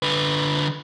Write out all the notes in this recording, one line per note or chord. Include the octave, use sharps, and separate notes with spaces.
D3 B4